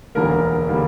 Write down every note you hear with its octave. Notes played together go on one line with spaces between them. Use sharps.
E1 D2 D3 G3 A#3 A#4
D3 G3 A#3